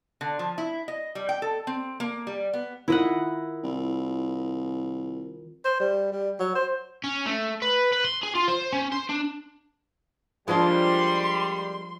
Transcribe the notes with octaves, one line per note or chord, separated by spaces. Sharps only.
D3
F3
E4
D#5
G3
G5
A4
C4
A#3
G3
B3
D#3 E4 F4 A#4 D#5 F#5
C2
C5
G3
G3
F#3
C5
C#4
A3
B4
B4
C6
G#4
F4
C5
C#4
C5
D4
F3 G3 G#3 A#3 D4 F4 C6